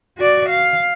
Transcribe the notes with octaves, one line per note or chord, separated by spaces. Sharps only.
F#4 D5
F5